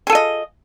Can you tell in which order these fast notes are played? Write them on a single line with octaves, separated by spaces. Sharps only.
G#4 A4 F4 D#5